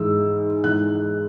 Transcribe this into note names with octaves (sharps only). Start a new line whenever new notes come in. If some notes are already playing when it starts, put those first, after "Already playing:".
Already playing: G#2 E3 G#3 E6
G#2 E3 G#3 F#6